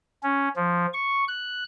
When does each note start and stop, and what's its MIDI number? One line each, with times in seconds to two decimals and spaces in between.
0.23 0.48 61
0.56 0.86 53
0.93 1.24 85
1.28 1.63 90